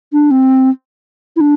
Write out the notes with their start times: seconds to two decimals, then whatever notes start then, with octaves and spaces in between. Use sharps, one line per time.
0.13 D4
0.31 C4
1.36 E4
1.41 D4